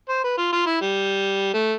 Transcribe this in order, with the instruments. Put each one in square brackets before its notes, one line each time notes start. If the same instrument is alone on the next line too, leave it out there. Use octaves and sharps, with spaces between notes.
[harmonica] C5
B4
F4
F4
E4
G3
A3